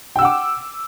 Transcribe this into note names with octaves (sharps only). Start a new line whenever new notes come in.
F#5 G5 D6 E6